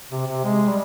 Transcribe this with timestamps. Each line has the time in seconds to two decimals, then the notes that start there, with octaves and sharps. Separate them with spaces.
0.11 C3
0.27 C3
0.44 G#3
0.69 G3